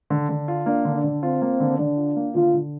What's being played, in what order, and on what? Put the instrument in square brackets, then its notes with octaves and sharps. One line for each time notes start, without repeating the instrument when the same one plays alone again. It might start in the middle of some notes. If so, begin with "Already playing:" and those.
[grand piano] D3
D3
F4
[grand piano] A#3 [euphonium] D4
[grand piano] D3
[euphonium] D4
[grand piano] D3
[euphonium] C4 [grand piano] F4
[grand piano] A#3
D3
[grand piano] D3 [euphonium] D4
[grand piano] F4
A#3
[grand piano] D3 [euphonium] F4
[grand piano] D3